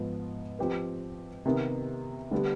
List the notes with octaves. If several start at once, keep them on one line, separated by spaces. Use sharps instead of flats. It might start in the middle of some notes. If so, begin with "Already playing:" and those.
Already playing: G#2 F3 B3
F3 C4 G4 B4
C3 D#3 B3 D#4
D3 G3 B3 D4 G4